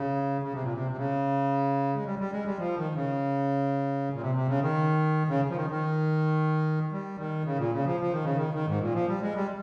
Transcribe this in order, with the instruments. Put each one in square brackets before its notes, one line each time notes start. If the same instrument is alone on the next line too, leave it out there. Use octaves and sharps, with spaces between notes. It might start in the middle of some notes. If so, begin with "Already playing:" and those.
Already playing: [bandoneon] C#3
C#3
C3
A#2
C3
C3
C#3
G#3
G3
G3
G#3
G3
F3
D#3
C#3
A#2
C3
C3
C#3
D#3
C#3
F3
D#3
D#3
G3
D#3
C#3
A#2
C#3
F3
F3
D#3
C#3
D#3
D#3
G#2
A#2
F3
G3
G#3
G3